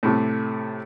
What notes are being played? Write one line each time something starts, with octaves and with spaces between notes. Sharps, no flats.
A2 C3 A3